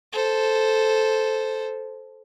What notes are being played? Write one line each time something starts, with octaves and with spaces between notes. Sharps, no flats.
A4 C5